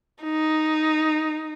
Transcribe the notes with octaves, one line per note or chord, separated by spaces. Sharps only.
D#4